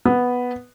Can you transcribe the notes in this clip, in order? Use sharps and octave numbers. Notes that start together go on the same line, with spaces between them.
B3